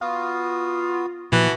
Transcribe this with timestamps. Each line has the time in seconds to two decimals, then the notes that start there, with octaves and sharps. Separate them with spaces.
0.01 B3 F4 F#4 D#6
1.32 A#2 E3 F3 B3 F#4 F#5 A5